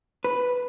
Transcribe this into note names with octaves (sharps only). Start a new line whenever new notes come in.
B4